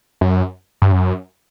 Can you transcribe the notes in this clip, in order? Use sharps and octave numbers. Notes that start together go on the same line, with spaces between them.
F#2
G2
F#2